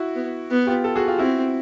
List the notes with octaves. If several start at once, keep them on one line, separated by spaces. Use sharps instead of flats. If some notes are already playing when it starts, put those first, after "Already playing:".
Already playing: E4 F#4
B3
B3
F4 G4
G4 A4
F#4 G#4
F4 G4
C4 E4 F#4